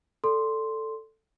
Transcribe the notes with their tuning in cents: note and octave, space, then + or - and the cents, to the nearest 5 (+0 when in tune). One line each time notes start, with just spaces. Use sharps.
A4 +5 D5 -30 C6 +0